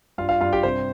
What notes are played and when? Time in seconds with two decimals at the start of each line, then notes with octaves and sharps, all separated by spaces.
0.18 G2 F4 F5
0.29 F4 F5
0.41 G2 F4 F5
0.53 G4 G5
0.63 C3 C5